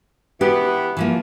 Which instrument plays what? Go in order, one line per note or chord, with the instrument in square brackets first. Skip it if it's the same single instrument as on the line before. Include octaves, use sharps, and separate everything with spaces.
[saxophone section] E3 B3 [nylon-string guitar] G4
[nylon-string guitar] E3 F3 A#3